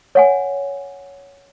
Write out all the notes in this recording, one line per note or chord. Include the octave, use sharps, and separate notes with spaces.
C#5 F#5 G#5